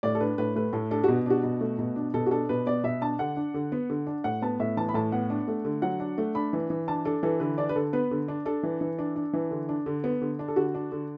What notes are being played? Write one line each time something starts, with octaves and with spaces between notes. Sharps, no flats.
A2 D5
A4
D4 B4
A2 B4
A3 B4
A2 A4
D4 A4
B2 F#4
D4 F#4
B2
A3
B2
D4
B2 A4
F#4
D4 A4
B2 B4
B3 D5
B2 E5
D4 A5
D3 F#5
D4
D3
B3
D3
D4
A2 F#5
B3 A5
A2 E5
E3 A5
B5
A2 A5
B3 F#5
D4
A3
D3
F#3 F#5
D4
A3
D4 B5
E3
E3
D4 A5
D4 A4
E3 A4
D3 B4
D4 D5
B4
D3 A4
B3 B4
D3
D4
D4 A4
E3
E3
D4
D4
E3
D3
D4
D3
B3
D3
D4
A4
D3 F#4
D4
D3